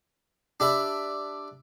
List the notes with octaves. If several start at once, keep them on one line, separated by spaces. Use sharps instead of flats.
D4 G4 E5 B5